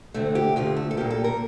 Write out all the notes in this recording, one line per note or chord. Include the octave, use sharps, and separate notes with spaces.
D2 D3 A3 C4
G4
D2 D3 A3 F4
A4
A4
A#2 G3 A#3 G4
A4
A#4